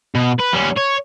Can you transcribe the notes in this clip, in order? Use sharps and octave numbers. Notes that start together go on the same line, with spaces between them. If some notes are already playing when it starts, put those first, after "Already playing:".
B2
B4
G3 C#4
C#5